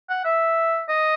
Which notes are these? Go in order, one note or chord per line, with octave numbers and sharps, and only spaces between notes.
F#5
E5
D#5